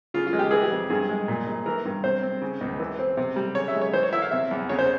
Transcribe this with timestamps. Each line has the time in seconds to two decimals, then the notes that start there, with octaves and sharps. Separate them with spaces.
0.14 C#3 F4
0.27 F4
0.33 G#3
0.39 G4
0.51 E3 G#4
0.63 G4
0.71 F2
0.90 G2 G#4
1.09 G#3
1.28 A#2
1.47 A#1
1.66 E3 A#4
1.85 G2
2.04 C3 C5
2.22 C4
2.42 C#3
2.61 C#2
2.79 E3
2.99 C4
3.17 C3
3.36 G3
3.55 C#3 C#5
3.68 E5
3.74 G#3
3.81 C#5
3.93 E3 C5
4.03 C#5
4.12 E4 E5
4.22 F5
4.31 C3 E5
4.51 E2
4.69 C#3 C#5
4.79 C5